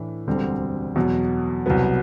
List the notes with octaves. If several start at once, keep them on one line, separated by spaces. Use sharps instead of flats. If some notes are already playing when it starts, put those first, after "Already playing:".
Already playing: A2 E3 A3 D4
E1 D2 D3 G3 C4
E2 B2 F#3
C2 B2 F#3 B3